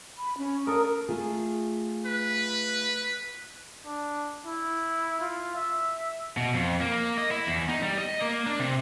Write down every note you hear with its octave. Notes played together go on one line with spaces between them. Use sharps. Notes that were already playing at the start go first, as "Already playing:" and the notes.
B5
C#4
A4 A#4 D#6
A3 F4 G#4
B4
D4
E4
F4
E5
B2
F2
A#3
D#5
E4
E2
D#4
G3
D#5
A#3
D4
C3